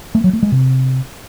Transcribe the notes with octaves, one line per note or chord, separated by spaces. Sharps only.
A3
F#3
A3
G#3
C3